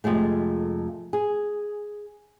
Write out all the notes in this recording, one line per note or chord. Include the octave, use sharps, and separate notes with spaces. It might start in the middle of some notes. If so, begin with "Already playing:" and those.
F2 C3 G#3 A3
G#4